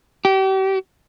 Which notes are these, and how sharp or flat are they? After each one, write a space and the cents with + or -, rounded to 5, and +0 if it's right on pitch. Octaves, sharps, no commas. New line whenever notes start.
G4 -35